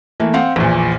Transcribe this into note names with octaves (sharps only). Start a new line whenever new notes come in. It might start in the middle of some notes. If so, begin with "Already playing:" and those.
E3 A3 A#3
C4 F5 F#5
A#1 E2 A#2